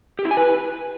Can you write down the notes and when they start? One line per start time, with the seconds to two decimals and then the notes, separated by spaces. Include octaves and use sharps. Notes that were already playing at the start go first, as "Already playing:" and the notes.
0.19 G4
0.25 E4
0.31 G#5
0.37 B4